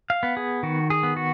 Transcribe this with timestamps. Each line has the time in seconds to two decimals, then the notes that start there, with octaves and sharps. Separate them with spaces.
0.10 F5
0.23 B3
0.37 G#4
0.63 D#3 F#4
0.90 G#4
1.03 B3
1.16 F#4